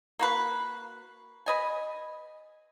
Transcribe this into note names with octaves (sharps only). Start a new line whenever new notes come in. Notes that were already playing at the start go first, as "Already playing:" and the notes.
A#3 F#4 B4
B4 D#5 G#5